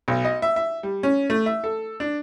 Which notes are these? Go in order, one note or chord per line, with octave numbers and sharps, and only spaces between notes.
B1
D#5
E5
E5
G3
C#4
A3
E5
A4
D4